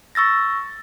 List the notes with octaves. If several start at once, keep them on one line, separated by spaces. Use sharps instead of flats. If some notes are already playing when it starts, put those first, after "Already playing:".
C#6 E6 A6 A#6